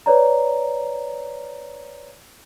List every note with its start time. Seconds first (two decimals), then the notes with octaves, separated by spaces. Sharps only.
0.06 B4 C#5 D5 A#5